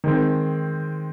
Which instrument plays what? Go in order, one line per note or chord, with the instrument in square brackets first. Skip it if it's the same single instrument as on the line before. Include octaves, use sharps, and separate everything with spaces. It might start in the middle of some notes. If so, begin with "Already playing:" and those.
[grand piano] D#3 G#3 C4